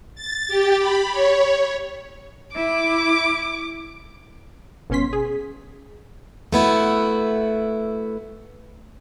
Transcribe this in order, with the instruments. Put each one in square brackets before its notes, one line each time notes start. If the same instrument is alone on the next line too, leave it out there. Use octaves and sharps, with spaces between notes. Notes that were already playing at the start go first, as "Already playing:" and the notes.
[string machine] A6
G4
B5
C#5
[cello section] E4 [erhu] D6
[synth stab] G1 B2 C#4 C6 B6
G#4
[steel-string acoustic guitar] A3 B3 E4 F#4